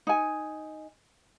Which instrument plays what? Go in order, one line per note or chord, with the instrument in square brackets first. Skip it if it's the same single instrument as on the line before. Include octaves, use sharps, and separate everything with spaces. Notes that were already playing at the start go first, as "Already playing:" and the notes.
[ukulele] D#4 G#5